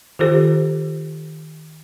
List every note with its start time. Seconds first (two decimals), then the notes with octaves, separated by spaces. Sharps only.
0.19 D#3 F4 G4 A4 C5